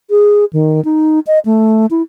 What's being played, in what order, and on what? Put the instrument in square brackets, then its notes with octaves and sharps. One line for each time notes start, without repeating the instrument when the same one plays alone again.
[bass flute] G#4
D#3
D#4
D#5
A3
E4